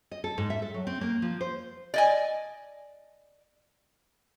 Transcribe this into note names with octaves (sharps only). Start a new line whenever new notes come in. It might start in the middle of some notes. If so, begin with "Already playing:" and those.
D#5
A4
G#2
E5
A4
F#3
C4
A#3
F3
C5
D5 D#5 G#5